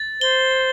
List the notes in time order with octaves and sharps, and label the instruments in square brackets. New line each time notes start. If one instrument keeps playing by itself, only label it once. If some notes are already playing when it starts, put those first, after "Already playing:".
Already playing: [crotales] A6
[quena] C5 [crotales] G7